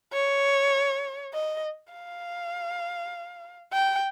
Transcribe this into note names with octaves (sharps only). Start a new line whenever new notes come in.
C#5
D#5
F5
G5